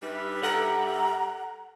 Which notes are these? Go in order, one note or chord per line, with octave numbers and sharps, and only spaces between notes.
G2 G3 D#4 B4 E5
A4 F#5 A#5